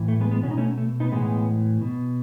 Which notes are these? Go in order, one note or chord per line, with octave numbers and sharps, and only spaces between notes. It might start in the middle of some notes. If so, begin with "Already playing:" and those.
Already playing: A2 E3
A3
G#3 B3
G#3 B3
B2 C#4
D#4
A3 C#4
A3
B3 D#4
A2 E3 G#3 B3
B2